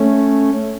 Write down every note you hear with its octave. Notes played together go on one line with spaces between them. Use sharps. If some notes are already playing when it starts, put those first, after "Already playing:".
Already playing: A3 C#4